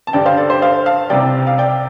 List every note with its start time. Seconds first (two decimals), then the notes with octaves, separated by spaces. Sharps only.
0.07 A5
0.13 G2 D3 G3 D5 G5
0.26 C5 F5
0.38 A4 D5
0.50 G4 C5
0.62 C5 F5
0.86 F5 A5
1.10 C2 C3 G3 D5 G5
1.47 F5
1.58 D5 G5